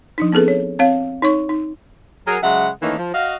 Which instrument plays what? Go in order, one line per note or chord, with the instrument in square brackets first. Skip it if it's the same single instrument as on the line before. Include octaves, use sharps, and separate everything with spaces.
[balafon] F3 D4 D#4
B3 C4 G#4 A4 B4
C#5
C4 C#5 F5
D#4 C#5 C#6
D#4
[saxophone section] F#3 G#4 A#4
C#3 F#3 G#3 E5 F#5
D#3 E3 A3 A#3 C#4 D#4
F3
F#4 D#5 F5